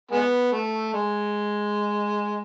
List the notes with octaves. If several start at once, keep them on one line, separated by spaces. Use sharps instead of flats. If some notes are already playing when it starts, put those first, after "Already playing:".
G#3 B3
A3
G#3